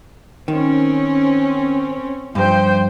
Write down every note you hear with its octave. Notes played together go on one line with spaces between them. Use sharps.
D#3 C4 C#4
G2 F3 C5 G5